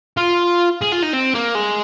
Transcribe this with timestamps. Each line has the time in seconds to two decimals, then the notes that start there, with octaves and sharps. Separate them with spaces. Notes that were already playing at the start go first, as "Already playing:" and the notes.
0.17 F4
0.82 G#4
0.93 F4
1.03 D#4
1.14 C4
1.35 A#3
1.55 G#3